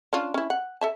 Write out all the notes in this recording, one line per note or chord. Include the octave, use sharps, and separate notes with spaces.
C#4 D4 F4
C#4 E4
F#5
A4 E5 A5